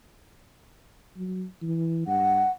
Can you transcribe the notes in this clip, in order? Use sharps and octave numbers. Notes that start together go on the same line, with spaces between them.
F#3
E3
G2 F#5